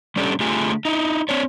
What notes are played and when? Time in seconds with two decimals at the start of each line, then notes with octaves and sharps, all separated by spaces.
0.16 G3 C#4 D4 G4 A4 D5
0.40 D3 A3 F4 G4 G#4 G#5
0.85 D#4 E4
1.29 C4 D4 C#5